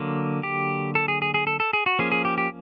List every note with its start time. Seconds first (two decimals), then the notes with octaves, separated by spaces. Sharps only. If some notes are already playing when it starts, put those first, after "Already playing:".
Already playing: D3 F#3 A#3
0.43 G4
0.95 A4
1.08 G#4
1.22 G#4
1.34 G#4
1.47 A4
1.60 A4
1.73 G#4
1.86 F#4
1.99 F3 A#3 C#4 G#4
2.12 G#4
2.25 G4
2.38 G4